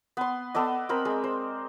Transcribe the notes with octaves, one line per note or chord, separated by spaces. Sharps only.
B3 C6
B3 A4 D5 D#5
C4 A#4 B5
G#3
C5